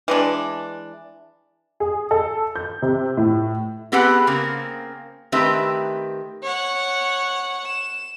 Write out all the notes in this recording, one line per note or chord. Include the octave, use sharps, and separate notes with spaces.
E3 G#3 D4
G#4
A4
G6
C3
A2
B3 C4 G4 G#4 B4 F#5
C#3 A#3 C4
D#3 A3 C4 G4 B4 E5
C#5 F#5
E7